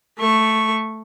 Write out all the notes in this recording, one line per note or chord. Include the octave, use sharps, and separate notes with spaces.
A3 C#6